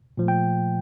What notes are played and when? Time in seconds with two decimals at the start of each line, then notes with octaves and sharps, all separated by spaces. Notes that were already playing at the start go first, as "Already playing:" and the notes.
0.17 A#2 F3 A3
0.28 G5